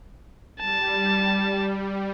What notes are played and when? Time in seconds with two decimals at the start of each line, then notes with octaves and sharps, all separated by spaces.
0.60 G3 A5